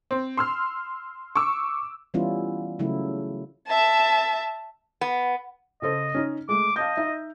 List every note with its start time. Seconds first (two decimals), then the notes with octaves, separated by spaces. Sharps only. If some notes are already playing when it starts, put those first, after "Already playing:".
0.11 C4
0.37 C6 E6 F6
1.36 C#6 D6 E6
2.14 E3 G3 B3 C#4 E4 F4
2.79 C#3 F#3 A3 E4
3.67 E5 A5
5.01 B3
5.82 C#3 A4 C5 D#5
6.15 C#4 D#4
6.49 G#3 A3 D6
6.76 D#5 F5 A5 G6
6.97 D#4 E5